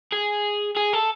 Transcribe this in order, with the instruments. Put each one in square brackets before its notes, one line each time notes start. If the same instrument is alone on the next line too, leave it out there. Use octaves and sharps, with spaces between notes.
[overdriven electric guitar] G#4
G#4
A4